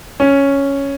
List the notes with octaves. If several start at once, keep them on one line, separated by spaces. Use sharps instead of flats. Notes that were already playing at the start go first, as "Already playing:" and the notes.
C#4